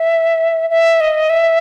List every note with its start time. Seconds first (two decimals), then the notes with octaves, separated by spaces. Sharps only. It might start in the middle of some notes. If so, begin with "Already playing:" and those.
Already playing: E5
0.70 E5
1.01 D#5
1.30 E5